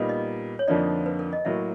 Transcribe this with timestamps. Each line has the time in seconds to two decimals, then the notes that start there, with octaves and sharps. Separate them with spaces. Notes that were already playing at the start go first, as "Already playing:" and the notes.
Already playing: A#2 G3 B3 D#4
0.09 D#5
0.59 C#5
0.68 F2 D3 F3 A#3 D#4 D5
1.06 B4
1.19 A#4
1.33 D#5
1.45 A2 F#3 A#3 E5